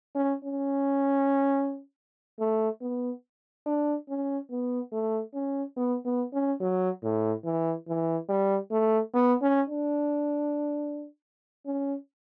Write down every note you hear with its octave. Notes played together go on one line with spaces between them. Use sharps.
C#4
C#4
A3
B3
D4
C#4
B3
A3
C#4
B3
B3
C#4
F#3
A2
E3
E3
G3
A3
B3
C#4
D4
C#4